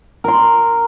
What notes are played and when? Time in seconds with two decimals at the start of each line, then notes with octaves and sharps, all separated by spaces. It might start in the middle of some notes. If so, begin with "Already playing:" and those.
0.24 A#4 C6